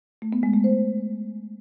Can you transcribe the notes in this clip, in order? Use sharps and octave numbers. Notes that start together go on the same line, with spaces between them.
A3
B3
G#3
A3
C5